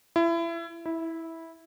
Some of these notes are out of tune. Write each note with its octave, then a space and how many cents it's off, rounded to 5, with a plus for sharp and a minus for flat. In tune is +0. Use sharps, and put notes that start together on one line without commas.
E4 +30
E4 -10